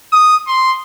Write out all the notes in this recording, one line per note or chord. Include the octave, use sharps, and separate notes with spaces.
D#6
C6